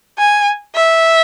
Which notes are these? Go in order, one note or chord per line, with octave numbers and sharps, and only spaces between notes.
G#5
E5